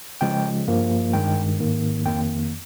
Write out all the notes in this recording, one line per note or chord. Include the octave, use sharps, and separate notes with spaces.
C#3 F3 G#3 G5
G2 F3 A#3
G2 D#3 G#3 G5
G#2 D#3 A#3
F2 D#3 A#3 G5